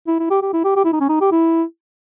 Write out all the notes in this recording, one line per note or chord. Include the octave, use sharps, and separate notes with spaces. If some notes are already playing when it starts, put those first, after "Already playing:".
E4
E4
G4
G4
E4
G4
G4
E4
D#4
C#4
D#4
G4
E4